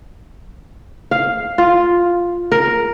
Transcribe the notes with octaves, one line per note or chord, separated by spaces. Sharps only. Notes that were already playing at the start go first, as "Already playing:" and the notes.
F5
F4
A#4